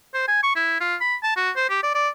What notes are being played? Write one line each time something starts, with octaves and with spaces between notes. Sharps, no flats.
C5
G#5
C#6
E4
F4
B5
A5
F#4
C5
G4
D5
D5